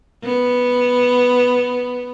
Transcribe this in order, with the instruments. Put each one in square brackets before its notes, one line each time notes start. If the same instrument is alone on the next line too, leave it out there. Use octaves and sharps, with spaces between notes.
[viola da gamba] B3